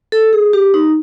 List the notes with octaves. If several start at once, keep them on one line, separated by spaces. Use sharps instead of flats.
A4
G#4
G4
D#4